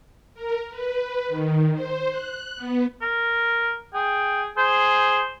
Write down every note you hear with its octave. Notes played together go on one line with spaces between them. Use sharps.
A#4
B4
D#3
C5
F#6
B3
A#4
G#4 G5
G#4 C5